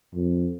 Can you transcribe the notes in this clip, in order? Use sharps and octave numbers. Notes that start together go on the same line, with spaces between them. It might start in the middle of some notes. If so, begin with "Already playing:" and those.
F2